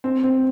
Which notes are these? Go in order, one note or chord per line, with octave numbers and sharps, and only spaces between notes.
C4
C4